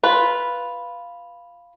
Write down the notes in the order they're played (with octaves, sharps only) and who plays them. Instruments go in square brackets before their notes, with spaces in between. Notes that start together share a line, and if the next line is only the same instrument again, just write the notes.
[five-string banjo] F4 B4